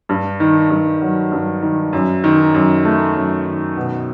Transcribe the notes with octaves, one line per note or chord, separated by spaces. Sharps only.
G2
D#3
G2
F#3
G2
D#3
F#2
D#3
F#2
A3
F#2
D#3
B2